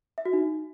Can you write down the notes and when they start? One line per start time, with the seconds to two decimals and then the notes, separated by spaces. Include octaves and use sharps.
0.18 E5
0.25 F#4
0.33 D#4